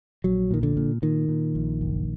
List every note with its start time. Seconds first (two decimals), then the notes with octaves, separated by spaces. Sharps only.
0.24 A#1 F#3
0.51 A#2 D#3
0.63 D3
0.77 A#2
1.02 A#2 D#3
1.29 A#2
1.55 A#1
1.81 F#1